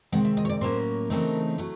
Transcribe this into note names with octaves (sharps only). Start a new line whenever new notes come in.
C3 D#3 G#3 C4 F#5
E5
D#5
C#5
D5
A2 F#3 A#3 C#4 C5
C#3 E3 A3 C4 D#4 A#4
F#3 A3